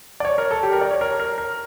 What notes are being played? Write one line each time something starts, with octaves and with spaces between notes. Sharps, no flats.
D5
C#5
A#4
A4
G4
A#4
D5
C#5
A#4
A#4
A#4